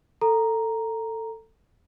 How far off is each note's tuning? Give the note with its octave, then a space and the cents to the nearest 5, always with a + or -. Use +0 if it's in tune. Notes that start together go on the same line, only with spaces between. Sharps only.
A4 +20 A#5 +0